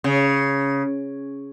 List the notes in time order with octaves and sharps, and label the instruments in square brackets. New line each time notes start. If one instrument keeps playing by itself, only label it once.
[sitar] C#3